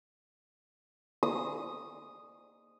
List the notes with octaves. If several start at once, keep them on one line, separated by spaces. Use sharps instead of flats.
D#6